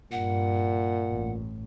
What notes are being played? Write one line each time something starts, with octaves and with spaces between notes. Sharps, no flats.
G2 A#2 F#5
A1